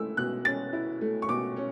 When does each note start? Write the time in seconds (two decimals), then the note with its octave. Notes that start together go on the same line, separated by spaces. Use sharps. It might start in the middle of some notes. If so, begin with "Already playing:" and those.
Already playing: A3 E4 E6
0.17 B2 F#6
0.45 C#4 A6
0.73 E4
1.01 A3
1.22 C#6
1.29 B2 D6
1.57 C#4